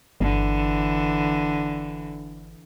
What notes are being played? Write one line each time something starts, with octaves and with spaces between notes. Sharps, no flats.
G1 D3 E3